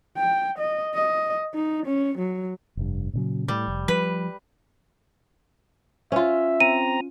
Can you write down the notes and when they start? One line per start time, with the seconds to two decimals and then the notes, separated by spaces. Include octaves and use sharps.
0.17 G5
0.59 D#5
0.95 D#5
1.55 D#4
1.86 C#4
2.18 F#3
2.77 F1 G2
3.13 A#2 C#3 F#3
3.48 A2 G3
3.68 F1
3.88 F3 G3 B4
6.12 C#4 F4 E5
6.60 C4 A#5 D#7